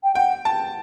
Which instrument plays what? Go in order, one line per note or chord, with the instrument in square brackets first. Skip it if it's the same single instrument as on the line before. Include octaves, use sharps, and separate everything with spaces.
[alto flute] G5
[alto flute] F#5 [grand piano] G5
[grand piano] A5